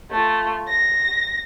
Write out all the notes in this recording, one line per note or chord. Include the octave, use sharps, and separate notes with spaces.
A3 F4
A#6